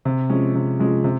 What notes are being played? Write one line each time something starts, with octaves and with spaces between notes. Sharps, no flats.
C3
F3 G#3 C#4
C3
F3 G#3 C#4
C3